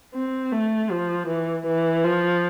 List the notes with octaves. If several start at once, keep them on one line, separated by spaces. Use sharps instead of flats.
C4
A3
F3
E3
E3
F3